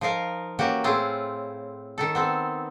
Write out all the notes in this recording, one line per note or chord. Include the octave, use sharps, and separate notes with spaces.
F3 D#4 A#4 F5 A#5
E3 A#3 C#4 F#4 G4
A2 C4 E4 F4 G#4
D#3 D#4 A4
B3 C4 A4